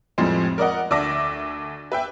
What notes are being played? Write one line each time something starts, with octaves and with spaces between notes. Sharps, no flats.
F2 A2 F3 G3 G#3 C4
A#4 D5 D#5 F#5
D2 D5 E5 A5 D6 A#6
B4 E5 G5